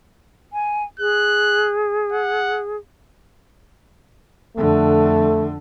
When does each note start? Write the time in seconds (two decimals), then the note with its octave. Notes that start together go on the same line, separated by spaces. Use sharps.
0.53 G#5
1.00 G#4 F#6
2.12 F#5
4.57 F2 D3 A3